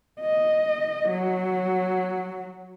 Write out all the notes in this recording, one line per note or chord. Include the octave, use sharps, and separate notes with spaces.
D#5
F#3